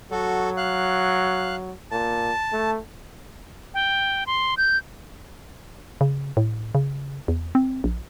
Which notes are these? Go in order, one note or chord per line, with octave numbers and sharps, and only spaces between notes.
F#3 F#4 A4
F5 F#6
A#2 A5
A3
G5
C6
G6
C#3
A2
C#3
E2
C4
A#1